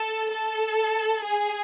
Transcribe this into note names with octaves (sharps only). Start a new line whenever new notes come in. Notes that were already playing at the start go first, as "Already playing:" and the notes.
Already playing: A4
A4
G#4